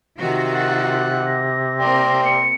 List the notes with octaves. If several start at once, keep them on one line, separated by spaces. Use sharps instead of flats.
C3 D#3 F4 F#4
F#5 A6
A#6
A#3 C4 A#4 D5 G5 C6
C#7